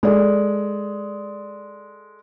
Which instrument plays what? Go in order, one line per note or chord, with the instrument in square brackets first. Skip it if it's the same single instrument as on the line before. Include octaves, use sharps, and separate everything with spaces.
[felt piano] G#3 A4 D5